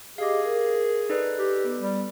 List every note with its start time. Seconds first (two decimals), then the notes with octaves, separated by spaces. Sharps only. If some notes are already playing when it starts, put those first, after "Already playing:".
0.18 G4 G#4 D#5 F5 D6 A#6
0.44 A#4
1.10 D#4 A4 B4 D5
1.39 G4
1.64 B3
1.80 G3